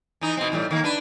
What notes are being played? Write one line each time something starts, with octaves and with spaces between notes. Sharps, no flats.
E3 D#4
B2 C4
E2 A2 G3
D#3 A#3
D4 B4